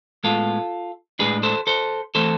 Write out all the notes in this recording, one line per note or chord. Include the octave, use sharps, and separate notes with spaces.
A2 G#3 B3 F4 A4
A2 G#3 D4 G#4 B4
A4 C5
A4 C5
E3 A3 C4 A4 C5